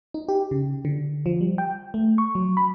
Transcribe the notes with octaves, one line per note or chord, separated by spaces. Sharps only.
D#4
G4
C#3
D3
F3
G3
G5
A3
C#6
F#3
B5